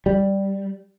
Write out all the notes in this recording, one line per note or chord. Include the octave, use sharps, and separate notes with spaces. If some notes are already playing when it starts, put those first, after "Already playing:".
G3